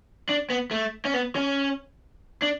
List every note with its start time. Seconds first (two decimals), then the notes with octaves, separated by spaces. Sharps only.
0.29 D4
0.50 B3
0.71 A3
1.05 C#4
1.14 B3
1.35 C#4
2.42 D4